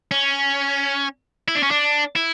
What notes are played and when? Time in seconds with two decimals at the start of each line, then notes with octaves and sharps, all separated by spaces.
0.11 C#4
1.48 E4
1.55 D4
1.63 C#4
1.71 D4
2.16 E4